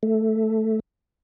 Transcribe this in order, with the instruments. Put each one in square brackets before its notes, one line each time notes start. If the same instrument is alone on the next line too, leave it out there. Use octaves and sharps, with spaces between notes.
[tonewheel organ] A3